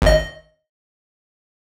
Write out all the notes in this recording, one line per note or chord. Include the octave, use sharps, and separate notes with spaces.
G#1 D#5